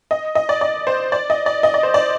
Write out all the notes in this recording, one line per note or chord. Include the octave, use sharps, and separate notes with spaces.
D#5
D#5
D5
D5
C5
D5
D#5
D5
D#5
D5
C5
D5